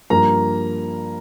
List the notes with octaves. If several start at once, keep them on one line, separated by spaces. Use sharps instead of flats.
G2 F3 A#3 A#5